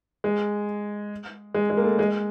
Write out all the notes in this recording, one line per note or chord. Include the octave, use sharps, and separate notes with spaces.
G#3
G#3
G#3
A#3
A3
G#3